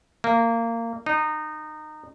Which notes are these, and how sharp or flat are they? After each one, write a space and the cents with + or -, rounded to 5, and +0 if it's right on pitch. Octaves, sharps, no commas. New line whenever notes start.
A#3 -20
D#4 -25